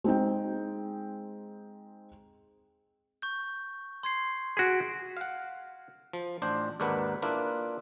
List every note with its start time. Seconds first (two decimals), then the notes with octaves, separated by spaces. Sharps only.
0.04 G#3 C4 D#4 G5
3.22 C#6 G6
4.03 C6 G#6 C7
4.57 F#4 G#4 B6 D7
5.17 F5 F#5
6.13 F3
6.42 A1 D4 C5
6.80 D#2 G#2 D4 A#4 B4 F#5
7.22 A#3 D4 E4 F4 B4